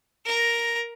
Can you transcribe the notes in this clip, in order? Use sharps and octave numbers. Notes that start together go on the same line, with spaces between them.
A#4 A#5